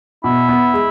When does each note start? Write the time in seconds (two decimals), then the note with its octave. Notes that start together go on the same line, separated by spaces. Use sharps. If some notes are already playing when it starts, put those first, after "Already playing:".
0.24 B2 E4
0.49 B3
0.74 G#3